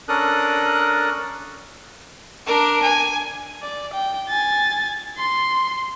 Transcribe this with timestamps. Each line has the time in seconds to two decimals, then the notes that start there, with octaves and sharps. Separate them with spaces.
0.09 C#4 D4 A4 A#4 D#6 F#6
2.46 D4 A#4
2.82 G#5
3.62 D5
3.93 G5
4.29 G#5 A6
5.17 C6